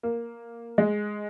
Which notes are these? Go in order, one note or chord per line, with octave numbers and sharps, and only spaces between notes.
A#3
G#3